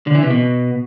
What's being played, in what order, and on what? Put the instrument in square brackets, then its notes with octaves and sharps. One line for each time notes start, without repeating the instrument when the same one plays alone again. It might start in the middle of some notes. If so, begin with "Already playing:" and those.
[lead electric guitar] D3
E3
C3
B2